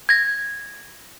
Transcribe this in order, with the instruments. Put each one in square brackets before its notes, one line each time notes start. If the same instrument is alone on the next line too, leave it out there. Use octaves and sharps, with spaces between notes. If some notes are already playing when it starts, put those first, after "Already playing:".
[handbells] G#6 A#6